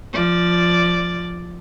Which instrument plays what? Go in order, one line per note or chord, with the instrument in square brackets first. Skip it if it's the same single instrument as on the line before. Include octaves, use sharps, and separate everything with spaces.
[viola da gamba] F3 D5